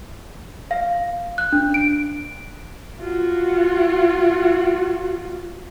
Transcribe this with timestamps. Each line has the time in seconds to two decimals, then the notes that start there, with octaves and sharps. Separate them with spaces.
0.71 F5
1.38 F#6
1.52 D4
1.74 D7
3.01 F4 F#4